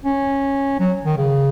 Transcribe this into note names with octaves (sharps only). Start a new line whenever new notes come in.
C#4
F#3
D#3
C#3